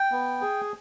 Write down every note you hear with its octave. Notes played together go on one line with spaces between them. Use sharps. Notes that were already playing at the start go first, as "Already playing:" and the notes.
Already playing: G5
B3
G#4